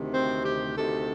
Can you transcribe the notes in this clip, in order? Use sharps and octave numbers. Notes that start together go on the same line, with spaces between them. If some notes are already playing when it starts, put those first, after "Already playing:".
Already playing: D2 C3 D#3
C4
G4
D2 C3 D#3 A4